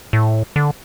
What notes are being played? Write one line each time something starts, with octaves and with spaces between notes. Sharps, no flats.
A2
D3